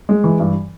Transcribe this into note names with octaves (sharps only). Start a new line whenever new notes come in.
G#3
E3
G2